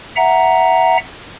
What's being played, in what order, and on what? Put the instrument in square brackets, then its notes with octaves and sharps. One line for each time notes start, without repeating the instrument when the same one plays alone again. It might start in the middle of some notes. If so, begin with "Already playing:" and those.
[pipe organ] E5 F#5 A#5